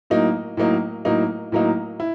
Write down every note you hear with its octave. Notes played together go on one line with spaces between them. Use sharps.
A2 F#3 A#3 D#4
A2 F#3 A#3 D#4
A2 F#3 A#3 D#4
A2 F#3 A#3 D#4
E4